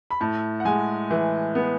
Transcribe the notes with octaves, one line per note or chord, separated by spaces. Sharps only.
B5
A2 A5
F#5
G#3 G#5
E3
B3